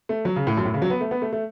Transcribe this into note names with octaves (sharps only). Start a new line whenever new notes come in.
A3
F#3
C#3
A2
F#2
A2
C#3
F#3
B3
A3
B3
A3
A3